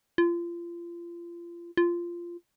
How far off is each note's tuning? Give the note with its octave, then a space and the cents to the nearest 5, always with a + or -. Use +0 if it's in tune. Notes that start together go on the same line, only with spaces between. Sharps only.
F4 -30
F4 -15